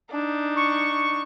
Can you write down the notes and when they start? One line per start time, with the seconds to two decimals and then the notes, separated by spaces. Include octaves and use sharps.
0.11 D4 D#4
0.57 C#6